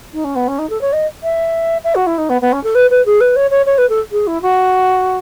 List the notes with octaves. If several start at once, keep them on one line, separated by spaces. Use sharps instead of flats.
D#4
C#4
B3
C#4
D#4
A4
C#5
D#5
E5
E5
F#4
E4
D#4
B3
B3
C#4
A4
B4
B4
G#4
B4
C#5
C#5
C#5
B4
A4
G#4
E4
F#4